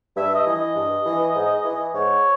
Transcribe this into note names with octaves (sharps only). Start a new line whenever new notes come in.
G2 E5
D#5
E3
D#5
G2
E3
G#2
E3
G#2 C#5